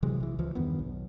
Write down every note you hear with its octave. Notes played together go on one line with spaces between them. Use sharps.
C3 E3 F#3 G#3
B1 E3
C#2 E3 F3
E2 G2 D#3 B3
B1